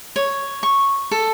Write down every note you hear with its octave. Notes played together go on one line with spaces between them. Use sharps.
C#5
C#6
A4